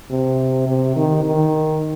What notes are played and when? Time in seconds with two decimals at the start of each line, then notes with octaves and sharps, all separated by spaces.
0.11 C3
0.67 C3
0.96 D#3
1.24 D#3